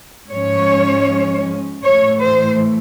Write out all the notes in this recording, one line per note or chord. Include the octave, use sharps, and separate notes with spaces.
G#2 F3 G#3 C#4 C#5
A2 E3 A3 C#5
C5